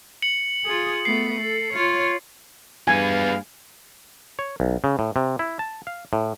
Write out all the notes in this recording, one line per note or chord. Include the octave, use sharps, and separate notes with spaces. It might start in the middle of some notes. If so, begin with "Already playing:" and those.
C#7 F#7
F4 G#4
A3 B3 C7
A4
F4 C#5
G2 B3 G#4 F5 G#5
C#5
B1
C#3
A2
C3
E4
A5
F5
A2